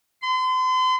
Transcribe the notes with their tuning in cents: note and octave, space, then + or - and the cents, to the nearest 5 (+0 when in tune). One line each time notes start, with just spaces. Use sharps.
C6 -40